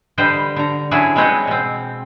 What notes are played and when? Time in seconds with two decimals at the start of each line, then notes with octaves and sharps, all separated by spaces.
0.18 D3 G3 B4 C5 D#5 G5
0.56 D3 A#5
0.91 F#3 C#4 D4 E4 G#4 B4
1.16 G#3 C4 B4 C#5 D#5 F#5
1.47 B2 C4